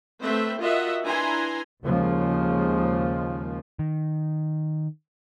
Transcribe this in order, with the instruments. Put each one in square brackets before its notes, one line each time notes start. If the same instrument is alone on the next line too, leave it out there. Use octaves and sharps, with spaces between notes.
[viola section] A3 C4 B4 C5 E5
F4 F#4 A#4 D#5 E5 F#5
D4 E4 B4 G#5 A#5 C6
[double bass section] D#2 C#3 F3 G#3 A#3
[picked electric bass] D#3